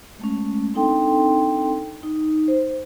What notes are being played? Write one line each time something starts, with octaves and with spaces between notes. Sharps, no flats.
G#3 A3 C#4
C4 D4 D#4 A4 G5 C6
D#4
C5